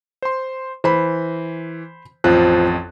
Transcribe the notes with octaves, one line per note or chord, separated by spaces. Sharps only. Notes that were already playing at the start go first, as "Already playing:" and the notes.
C5 C6
E3 C5 B5
A1 F2 F3 F#6